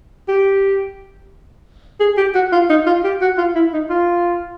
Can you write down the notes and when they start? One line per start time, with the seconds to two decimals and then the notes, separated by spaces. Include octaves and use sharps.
0.28 G4
2.00 G#4
2.17 G4
2.34 F#4
2.52 F4
2.70 D#4
2.87 F4
3.04 G4
3.21 F#4
3.38 F4
3.55 E4
3.73 D#4
3.89 F4